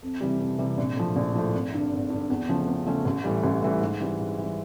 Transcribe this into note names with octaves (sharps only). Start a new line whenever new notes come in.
F2
C3 E3 G3
F2
C3 E3 G3
A#1
A2 F3
A#1
A2 F3
G#1
G2 D3
G#1
G2 D3
E2
C#3 F3 A3 C#4
E2
C#3 F3 A3 C#4
A1
A2 E3 G3
A1
A2 E3 G3
G#2
E3 G3
G#2
E3 G3